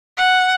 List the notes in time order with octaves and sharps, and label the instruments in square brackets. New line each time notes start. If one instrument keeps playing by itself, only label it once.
[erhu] F#5